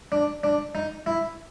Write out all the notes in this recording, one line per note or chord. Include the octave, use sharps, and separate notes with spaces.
D4
D4
D#4
E4